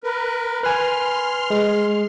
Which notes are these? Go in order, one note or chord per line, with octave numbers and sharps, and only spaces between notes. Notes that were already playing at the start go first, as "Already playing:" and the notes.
A#4 B4
B4 G#5 C6 F6
G#3